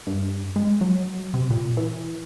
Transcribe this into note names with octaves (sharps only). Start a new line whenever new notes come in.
G2
G#3
F#3
C3
A#2
E3